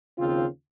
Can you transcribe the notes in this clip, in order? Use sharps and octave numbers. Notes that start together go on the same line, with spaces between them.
D#2 C#3 F3 C4 F4